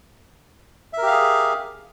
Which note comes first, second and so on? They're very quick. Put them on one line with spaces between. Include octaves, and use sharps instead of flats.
E5 A#4 G4 F5 G#4